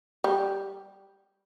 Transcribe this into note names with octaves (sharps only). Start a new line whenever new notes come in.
G3